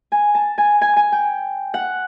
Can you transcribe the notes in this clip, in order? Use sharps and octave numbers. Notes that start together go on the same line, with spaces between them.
G#5
A5
G#5
G#5
G#5
G5
F#5